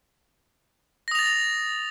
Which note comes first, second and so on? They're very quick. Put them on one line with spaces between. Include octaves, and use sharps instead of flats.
A#6 D#6 F7 A6